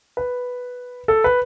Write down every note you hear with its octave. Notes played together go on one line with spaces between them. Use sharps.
B4
A4
B4